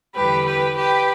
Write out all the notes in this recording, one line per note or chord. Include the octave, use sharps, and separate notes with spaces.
E2 D3 G3 G4 B4
G4 B4
G4 B4